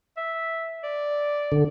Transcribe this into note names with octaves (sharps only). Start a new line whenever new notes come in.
E5
D5
D3